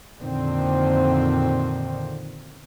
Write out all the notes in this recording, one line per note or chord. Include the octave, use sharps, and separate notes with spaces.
F2 A#2 D3 D#3 C4